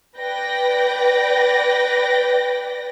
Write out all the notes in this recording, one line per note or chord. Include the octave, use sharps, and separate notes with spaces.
B4 D5 G5 A#6